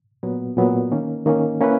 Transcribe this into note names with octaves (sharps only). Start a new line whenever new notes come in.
A#2 F#3 B3
A#2 F#3 B3
D#3 A#3 C#4
D#3 A#3 C#4
A#3 C#4 E4 B4